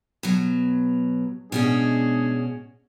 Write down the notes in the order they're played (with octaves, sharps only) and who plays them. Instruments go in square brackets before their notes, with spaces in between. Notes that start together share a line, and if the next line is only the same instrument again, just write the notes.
[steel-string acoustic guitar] B2 F#3
[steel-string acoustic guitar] B2 C#4 F#4 [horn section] G#3 D4 G#4